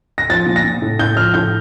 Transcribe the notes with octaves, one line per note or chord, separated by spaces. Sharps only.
A#6
F3 A6
A#2
A#6
A#2
A2
A2 G6
F3 F6
A2 G6